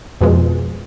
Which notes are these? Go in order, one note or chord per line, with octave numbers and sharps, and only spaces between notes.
F2 B2 F3 G#3